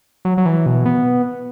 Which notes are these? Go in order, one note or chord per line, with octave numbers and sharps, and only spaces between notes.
F#3
F#3
E3
B2
B3